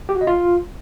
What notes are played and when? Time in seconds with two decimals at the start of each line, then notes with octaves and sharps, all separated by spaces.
0.09 G4
0.15 F#4
0.21 D#5
0.27 F4